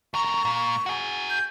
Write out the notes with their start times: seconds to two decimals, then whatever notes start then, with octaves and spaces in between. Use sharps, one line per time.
0.14 E2 A#4 C#6
0.45 A#2
0.86 F#4 G#4
1.30 G6